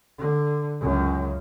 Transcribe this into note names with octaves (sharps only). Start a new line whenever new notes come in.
D3
C#2 F#2